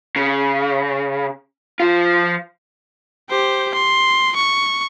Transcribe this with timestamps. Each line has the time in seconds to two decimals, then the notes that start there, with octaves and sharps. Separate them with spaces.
0.16 C#3
1.80 F3 F4
3.30 G4 C5
3.74 C6
4.36 C#6